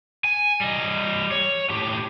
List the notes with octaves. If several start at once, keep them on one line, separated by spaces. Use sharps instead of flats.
G#5
G3 D#5
C#5
A2 G4